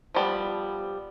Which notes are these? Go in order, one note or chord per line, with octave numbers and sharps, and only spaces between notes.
F3 G3 B3